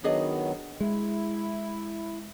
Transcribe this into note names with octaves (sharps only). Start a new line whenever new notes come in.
D#3 F#3 B3 D4 G#4 D#5
G#3 E4